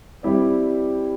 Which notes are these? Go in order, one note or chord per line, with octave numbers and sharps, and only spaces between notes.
G3 C4 E4 G4 D5